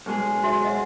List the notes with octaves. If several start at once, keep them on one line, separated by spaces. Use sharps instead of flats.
B1 G#3 G#4
F#4 C#5 E5
D#5 E5 F#5